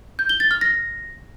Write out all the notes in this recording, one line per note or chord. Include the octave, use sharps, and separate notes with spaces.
G6
G7
A6
F6
A#6